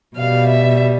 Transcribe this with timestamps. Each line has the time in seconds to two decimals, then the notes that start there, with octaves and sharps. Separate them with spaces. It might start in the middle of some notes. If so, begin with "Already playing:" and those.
0.17 B2 G3 F5
0.48 E5